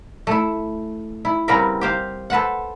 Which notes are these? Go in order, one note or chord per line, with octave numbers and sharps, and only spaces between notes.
A3 E4
E4
C#3 G3 C4 A#4 B4
G4 C5 F5
A4 B4 C5 F#5